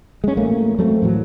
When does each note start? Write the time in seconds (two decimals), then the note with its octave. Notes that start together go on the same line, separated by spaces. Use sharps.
0.24 G#3 C#4
0.37 A1 A3 A#3
0.79 F#3 A3 C4
1.02 A2 E3 F#3